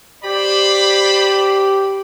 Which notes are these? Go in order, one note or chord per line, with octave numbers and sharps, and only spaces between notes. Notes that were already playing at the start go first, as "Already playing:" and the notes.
G4 C5 D5 B5